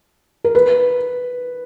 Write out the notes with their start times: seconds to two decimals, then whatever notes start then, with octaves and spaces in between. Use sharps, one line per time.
0.44 A#4
0.55 B4